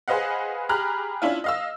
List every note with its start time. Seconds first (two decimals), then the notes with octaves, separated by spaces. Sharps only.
0.08 G#4 B4 C5 D#5 F5 F#5
0.69 G4 G#4 A#5 B5 F6 F#6
1.22 C#4 D4 E4 F4
1.44 D#5 F5 E6